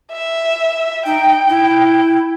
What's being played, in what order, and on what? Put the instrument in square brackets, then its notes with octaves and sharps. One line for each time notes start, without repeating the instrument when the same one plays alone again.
[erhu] E5
[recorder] D#4 [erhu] G5
[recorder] E4